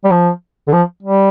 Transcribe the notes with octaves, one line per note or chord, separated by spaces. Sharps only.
G3
F3
D3
F3
G3